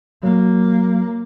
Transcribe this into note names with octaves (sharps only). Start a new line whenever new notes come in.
F#3 A#3